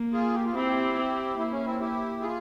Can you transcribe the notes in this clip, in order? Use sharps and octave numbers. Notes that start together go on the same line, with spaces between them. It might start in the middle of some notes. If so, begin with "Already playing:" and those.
Already playing: A#3
F4 G#4
G4
F4
C4 E4 G4
C4
A#3 E4
C#4
C4 E4
E4 G4
F4 G#4